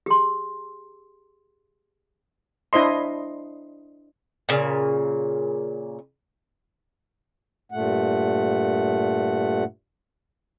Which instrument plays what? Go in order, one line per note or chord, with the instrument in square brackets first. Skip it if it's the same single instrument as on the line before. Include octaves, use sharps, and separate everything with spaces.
[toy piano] G4 G#4 C6
[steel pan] D4 E4 C5 D#5 C6
[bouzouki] A#2 C#3
[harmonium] G2 A#2 A3 F#5